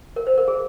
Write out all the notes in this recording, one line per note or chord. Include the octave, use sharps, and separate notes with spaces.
A#4
C5
A#4
G#4